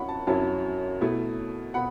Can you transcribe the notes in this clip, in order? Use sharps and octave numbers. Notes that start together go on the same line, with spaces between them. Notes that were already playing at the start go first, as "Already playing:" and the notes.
Already playing: F#2 F#3 C#4 E4 F#5 B5 C#6
A5
F#2 F#3 C#4 E4 A5
B2 A3 E4
B2 F#5 B5